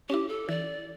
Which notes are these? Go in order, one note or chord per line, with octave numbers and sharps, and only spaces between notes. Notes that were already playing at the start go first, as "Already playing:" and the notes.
C#4 E4 G4
A4
E3 D5